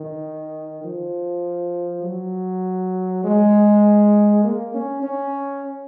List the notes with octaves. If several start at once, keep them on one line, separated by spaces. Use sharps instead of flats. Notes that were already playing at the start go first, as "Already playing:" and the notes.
Already playing: D#3
F3
F#3
G#3
A#3
C#4
C#4